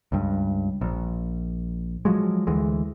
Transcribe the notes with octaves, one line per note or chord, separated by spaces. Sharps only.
C#2 G2
A#1
F3 F#3 G#3
D2 E3 G#3